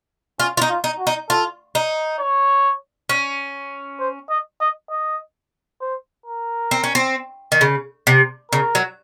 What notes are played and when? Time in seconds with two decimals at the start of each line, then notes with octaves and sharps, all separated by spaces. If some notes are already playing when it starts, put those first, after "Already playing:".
0.39 C#4 F4
0.57 F4
0.61 D#4
0.69 F4
0.84 D#4
0.99 F#4
1.07 D#4
1.29 F4 A4
1.75 D#4
2.20 C#5
3.09 C#4
4.00 C5
4.30 D#5
4.61 D#5
4.91 D#5
5.81 C5
6.26 A#4
6.71 C4
6.84 C#4
6.95 C4
7.52 D#3
7.61 C#3
8.07 C3
8.52 C#3 A#4
8.75 F#3